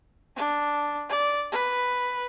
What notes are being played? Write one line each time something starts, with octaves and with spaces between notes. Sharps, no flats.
D4
D5
B4